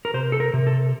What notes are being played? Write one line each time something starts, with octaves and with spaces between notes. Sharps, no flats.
A#4
C3 C5
A4
A#4
C3
A4